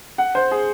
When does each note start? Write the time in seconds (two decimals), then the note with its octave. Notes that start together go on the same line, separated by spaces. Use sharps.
0.18 F#5
0.35 C5
0.51 G#4